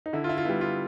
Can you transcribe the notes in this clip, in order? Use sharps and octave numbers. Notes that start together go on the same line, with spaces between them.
D#4
D3 E4
F4
E4
F4
G3 B3 E4
F4